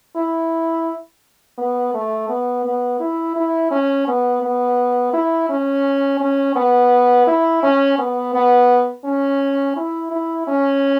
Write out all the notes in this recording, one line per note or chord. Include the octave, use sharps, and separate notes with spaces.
E4
B3
A3
B3
B3
E4
E4
C#4
B3
B3
E4
C#4
C#4
B3
E4
C#4
B3
B3
C#4
E4
E4
C#4